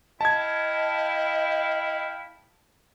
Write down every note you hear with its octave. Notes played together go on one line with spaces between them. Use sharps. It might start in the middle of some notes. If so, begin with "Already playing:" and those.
E4 D#5 F5 G5 A5 G#6